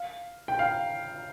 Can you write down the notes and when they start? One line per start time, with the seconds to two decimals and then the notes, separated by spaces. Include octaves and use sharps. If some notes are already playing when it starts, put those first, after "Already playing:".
Already playing: F5
0.48 G5
0.59 F5